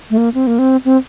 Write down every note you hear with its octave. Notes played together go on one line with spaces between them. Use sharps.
A3
A#3
C4
A#3
C4
C4